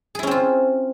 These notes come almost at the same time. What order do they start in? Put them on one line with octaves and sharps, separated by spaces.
G#4 E4 C#4 C4 F4